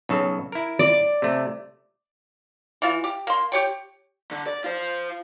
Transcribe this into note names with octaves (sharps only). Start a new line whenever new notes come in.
B1 C#3 A4
E4 A#4
D5
C3 A3
E3 F4
G4
A#3 C6
G4 C#5 G5
D3
D5
F4 C5